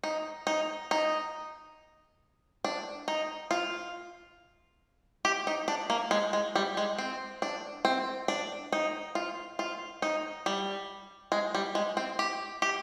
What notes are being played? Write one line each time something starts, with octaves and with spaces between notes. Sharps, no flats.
D#4
D#4
D#4
D4
D#4
F4
G4
D#4
D4
A#3
G#3
G#3
G3
G#3
C4
D4
C4
D4
D#4
F4
F4
D#4
G3
G#3
G3
G#3
C4
G4
G4